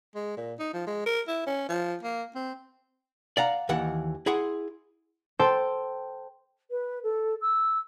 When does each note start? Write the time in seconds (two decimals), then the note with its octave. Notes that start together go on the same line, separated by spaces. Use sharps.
0.15 G#3
0.37 A#2
0.59 D#4
0.73 F3
0.87 G#3
1.06 A#4
1.28 E4
1.47 C#4
1.69 F3
2.03 A#3
2.35 C4
3.37 D5 F5 F#5 A#5
3.69 D#2 D#3 E3 F#5
4.26 E4 G#4 F#5 C6
5.39 A4 C5 G5 A5
6.71 B4
7.03 A4
7.41 E6